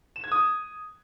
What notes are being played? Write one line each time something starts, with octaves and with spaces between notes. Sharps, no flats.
E7
G#6
D#6